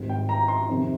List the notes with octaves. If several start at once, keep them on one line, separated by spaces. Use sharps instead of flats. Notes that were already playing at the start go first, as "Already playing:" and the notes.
Already playing: G#1 G#2 G3
G5
A#5
C6
F2 C3 D#3